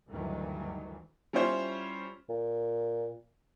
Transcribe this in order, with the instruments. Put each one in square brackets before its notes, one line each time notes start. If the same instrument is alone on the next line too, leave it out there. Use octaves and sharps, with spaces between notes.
[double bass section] D2 G2 D#3 E3 F#3
[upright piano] G3 C#4 E4 F4 C5 C#5
[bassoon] A#2